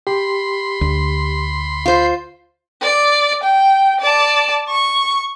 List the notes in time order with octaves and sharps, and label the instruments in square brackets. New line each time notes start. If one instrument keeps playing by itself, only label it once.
[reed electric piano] G4 [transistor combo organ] B5 C6
[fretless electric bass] D2
[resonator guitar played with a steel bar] F4 C5
[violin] D5
G5
D5 A5
C#6